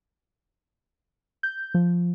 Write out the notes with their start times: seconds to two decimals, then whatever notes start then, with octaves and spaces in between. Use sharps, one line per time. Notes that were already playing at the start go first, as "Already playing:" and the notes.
1.43 G6
1.74 F3